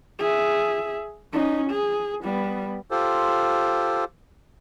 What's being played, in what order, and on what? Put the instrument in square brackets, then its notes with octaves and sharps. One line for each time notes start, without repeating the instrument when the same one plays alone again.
[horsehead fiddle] G#4 E5
C#4 D#4
G#4
G3 B3
[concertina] F4 G4 A4 C5